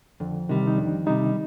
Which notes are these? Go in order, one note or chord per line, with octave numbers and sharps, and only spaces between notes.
F2 D3
C3 D#3 G3
D#4
F2 D4
C3 G3 D#4